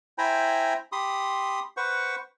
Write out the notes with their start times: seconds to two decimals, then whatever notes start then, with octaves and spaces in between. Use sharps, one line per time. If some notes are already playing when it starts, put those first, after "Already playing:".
0.18 E4 C5 G5 G#5 A#5 B5
0.92 G4 B5 C6 D#6
1.77 B4 C5 F#5 C#6